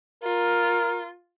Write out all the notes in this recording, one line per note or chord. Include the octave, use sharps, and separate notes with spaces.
F4 A#4